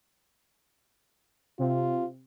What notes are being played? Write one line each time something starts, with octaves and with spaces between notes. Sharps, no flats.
C3 F4